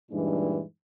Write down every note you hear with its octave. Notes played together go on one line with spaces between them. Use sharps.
G2 A#2 E3 G#3 D4 D#4